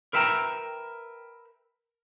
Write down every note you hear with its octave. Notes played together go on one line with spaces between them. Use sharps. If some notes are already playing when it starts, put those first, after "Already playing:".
A#4 B4 E5 G5 A#5